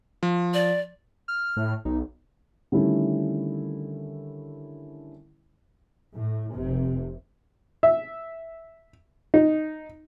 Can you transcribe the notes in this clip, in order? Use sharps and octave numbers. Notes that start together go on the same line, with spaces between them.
F3
D5
F6
A2
B1 D#4
D3 D#3 G3 A3 C#4 E4
A2
F1 C3
E5
D#4